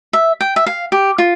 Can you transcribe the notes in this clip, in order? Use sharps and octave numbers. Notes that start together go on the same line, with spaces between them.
E5
G5
E5
F5
G4
F4